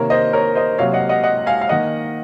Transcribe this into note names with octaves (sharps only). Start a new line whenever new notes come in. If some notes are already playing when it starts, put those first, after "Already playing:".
Already playing: C3 D#3 A#3 A#4 C#5
C5 D#5
A#4 C#5
C5 D#5
C3 F#3 A#3 C#5 F5
D#5 F#5
D#5 F#5
D#5 F#5
F5 G#5
F5
D#3 A#3 D#5 F#5